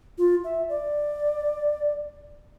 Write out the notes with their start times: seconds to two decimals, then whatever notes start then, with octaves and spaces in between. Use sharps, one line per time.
0.18 F4
0.44 E5
0.69 D5